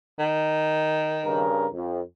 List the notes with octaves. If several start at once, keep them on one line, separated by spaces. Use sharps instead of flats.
D#3
G2 C#3 A#4
F2